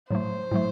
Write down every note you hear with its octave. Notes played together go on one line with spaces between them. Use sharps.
A2 F#3 A3 C5
A2 F#3 A3